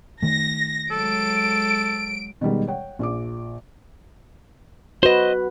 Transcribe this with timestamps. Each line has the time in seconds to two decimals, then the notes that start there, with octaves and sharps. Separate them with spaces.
0.22 D#3 A3 A#6
0.91 F#3 G#3 A4 D7
2.41 B2 D#3 G3 G#3
2.67 C#5 F#5 G5
2.99 A#1 F4 D6
5.03 F#4 B4 C5 D#5